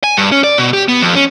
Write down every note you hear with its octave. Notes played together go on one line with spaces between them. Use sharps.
G#5
G2
C#4
D5
B2
G4
B3
F2
C#4